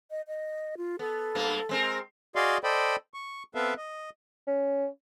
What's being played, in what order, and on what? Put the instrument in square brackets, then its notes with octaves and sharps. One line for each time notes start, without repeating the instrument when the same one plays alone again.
[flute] D#5
D#5
F4
[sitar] B3 [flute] A4
[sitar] G2 A#3 B3
G#3 C4 A#4
[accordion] F#4 G#4 D5 D#5 F5 C6
A4 C5 D5 D#5 G5 B5
C#6
B3 C4 A4 B4 E5 F5
D#5
[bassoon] C#4